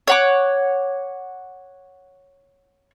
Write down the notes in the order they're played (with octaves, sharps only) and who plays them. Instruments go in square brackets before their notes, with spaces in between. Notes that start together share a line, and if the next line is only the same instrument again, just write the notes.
[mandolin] C#5 F#5 D6